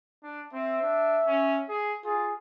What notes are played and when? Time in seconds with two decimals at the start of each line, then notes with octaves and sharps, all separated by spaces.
0.23 D4
0.53 C4 E5
0.82 D4
1.27 C#4
1.69 G#4
2.05 F4 G#4